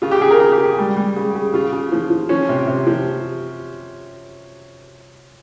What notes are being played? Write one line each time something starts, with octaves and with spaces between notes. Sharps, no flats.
C#3 F4
G4
C#3 G#4
A#4
C#3 G#4
G4
C#3
G#4
G3
G3
C#3
C#3
C#3 F4
C#3
F3
F3
F3 C#4
C3
C3
F3